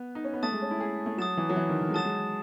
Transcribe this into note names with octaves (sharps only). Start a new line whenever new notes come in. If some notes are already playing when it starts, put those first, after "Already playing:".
Already playing: B3
D#4
C#4
B3
A3 A5 D#6 A6
G#3
C#4
E4
G#4
A3
F#3 D#6 A6 E7
E3
F#3
E3
D#3
D#3
G#3
F#3 A5 D#6 A6 E7
G#3